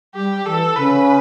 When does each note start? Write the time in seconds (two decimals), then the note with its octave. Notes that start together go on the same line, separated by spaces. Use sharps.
0.15 G3 G4
0.46 E3 A4
0.76 C#3 B4